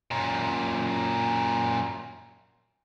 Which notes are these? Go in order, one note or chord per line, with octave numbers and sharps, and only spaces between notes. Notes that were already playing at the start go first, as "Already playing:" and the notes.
F#2 A#2